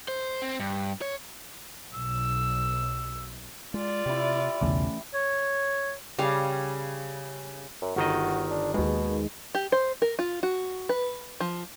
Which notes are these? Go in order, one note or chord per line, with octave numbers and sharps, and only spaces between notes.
C5
C4
G2
C#5
B1 E6
G#3 F4 D5
C3 E4 G4
B1 E2 C#3 E3 A3 C#4 D6
C#5
C#3 G3 F5
F#2
G1 D#3 F#4 D#5
D4
D#2 B2 G#3
G4
C5
A#4
F4
F#4
B4
F3